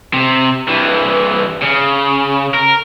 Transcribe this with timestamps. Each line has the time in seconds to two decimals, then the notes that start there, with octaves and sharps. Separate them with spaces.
0.13 C3
0.68 G2 E3
1.62 C#3
2.55 A#4